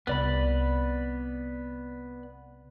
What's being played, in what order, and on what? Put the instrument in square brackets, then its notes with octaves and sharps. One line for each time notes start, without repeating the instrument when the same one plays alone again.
[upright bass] C2 [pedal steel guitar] B3 D5 B5